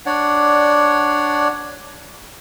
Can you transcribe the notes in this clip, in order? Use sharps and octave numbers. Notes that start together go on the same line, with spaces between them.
D4 C#5 D5 F#5